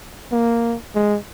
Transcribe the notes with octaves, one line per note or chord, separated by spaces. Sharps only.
A#3
G#3